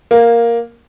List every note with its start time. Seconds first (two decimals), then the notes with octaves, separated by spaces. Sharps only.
0.11 A#3